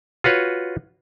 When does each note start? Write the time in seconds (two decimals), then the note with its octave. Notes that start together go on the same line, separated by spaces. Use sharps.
0.24 F4 F#4 B4 C#5